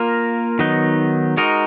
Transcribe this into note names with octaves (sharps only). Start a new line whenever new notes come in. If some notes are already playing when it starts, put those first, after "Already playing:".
Already playing: A#3 F4 A#4
D#3 F#3 B3 D#4
G#3 D#4 F#4 A#4